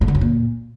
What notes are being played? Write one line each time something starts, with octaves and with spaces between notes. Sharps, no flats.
G2
D3
F#2
A#2